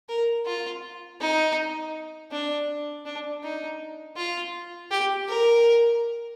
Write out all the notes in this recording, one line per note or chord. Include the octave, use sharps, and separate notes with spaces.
A#4
F4
D#4
D4
D4
D#4
F4
G4
A#4